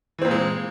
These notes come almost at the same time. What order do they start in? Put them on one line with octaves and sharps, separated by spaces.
E3 C4 A#2 A#3 G#3